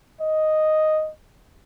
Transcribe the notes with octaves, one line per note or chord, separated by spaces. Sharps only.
D#5